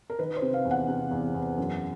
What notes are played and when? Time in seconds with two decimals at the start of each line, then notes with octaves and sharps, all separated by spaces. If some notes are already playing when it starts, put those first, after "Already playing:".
0.10 A#4
0.19 D#3 B4
0.36 C5
0.42 C3
0.54 F5
0.65 E2
0.71 F#5
0.88 C3
1.11 E2
1.34 E2
1.58 F#2